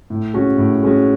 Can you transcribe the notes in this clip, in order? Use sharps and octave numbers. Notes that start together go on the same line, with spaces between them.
A2
G#3 C#4 F#4
A2
G#3 C#4 F#4